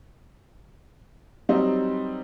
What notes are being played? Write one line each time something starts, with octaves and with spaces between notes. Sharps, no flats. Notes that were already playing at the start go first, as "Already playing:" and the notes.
F#3 G3 C4 D#4